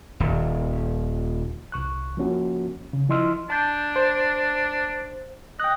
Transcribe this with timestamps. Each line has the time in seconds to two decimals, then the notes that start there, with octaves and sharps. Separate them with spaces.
0.20 D#1 D#2
1.72 C2 C#6 F#6
2.17 F3 A#3 C#4 F#4
2.93 C#3
3.09 F3 E4 D#5 C6 E6 F6
3.50 D4 A5 G6
3.96 C5
5.60 D#5 G5 F#6